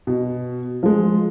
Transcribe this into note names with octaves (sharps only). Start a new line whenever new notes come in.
B2
F3 G#3